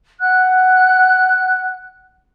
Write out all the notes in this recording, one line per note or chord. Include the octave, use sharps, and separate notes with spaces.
F#5 F#6